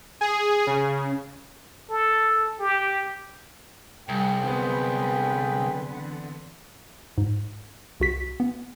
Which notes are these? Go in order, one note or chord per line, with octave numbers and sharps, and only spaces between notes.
G#4
C#3
A4
G4
C2 G3 G#4 G5
D3 F#3 B3 C4 B4
D3 E3 F#5
G#2
C2 F#4 B6
B3